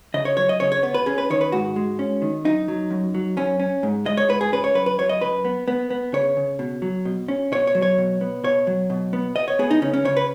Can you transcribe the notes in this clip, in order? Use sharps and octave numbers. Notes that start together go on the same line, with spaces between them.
C#3 D#5
C#5
F#3 C#5
D#5
C#3 C#5
C#5
B3 C#5
B4
C#4 G#4
B4
D#3 C#5
B4
G#2 F#4
G#3
C#4
D#3
F#2 D#4
F#3
F#2
F#3
F#2 C#4
C#4
G#2
G#3 D#5
C#5
G#2 B4
G#4
C#4 B4
C#5
F#2 B4
B4
F#3 C#5
D#5
F#2 B4
B3
B3
B3
C#3 C#5
C#3
B2
F#3
B2
C#4
B2 C#5
C#5
F#3
C#5
B2
B3
B2 C#5
F#3
B2
B3
B3 D#5
C#5
B3 G#4
D#4
C#3 C#4
C#4
C#3 C#5
B4